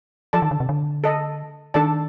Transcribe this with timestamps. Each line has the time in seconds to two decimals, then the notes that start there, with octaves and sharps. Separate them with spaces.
0.33 F3 A4 D5 A5
0.42 D#3
0.51 D3
0.60 C3
0.69 D3
1.04 A4 D#5 A5
1.74 D#3 D4 A4 D5 A5